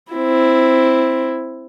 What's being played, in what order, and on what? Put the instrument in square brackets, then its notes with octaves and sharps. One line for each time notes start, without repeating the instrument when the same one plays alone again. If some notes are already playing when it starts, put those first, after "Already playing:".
[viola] C4 E4